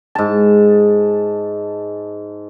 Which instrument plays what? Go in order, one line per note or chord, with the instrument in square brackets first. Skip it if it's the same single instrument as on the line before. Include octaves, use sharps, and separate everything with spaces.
[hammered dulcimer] G#2 A5